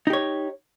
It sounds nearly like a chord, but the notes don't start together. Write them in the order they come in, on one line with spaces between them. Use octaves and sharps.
D#4 G4 C#5